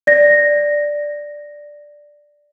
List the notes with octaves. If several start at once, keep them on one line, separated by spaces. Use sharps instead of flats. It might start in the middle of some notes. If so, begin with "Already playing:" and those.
D5 A#6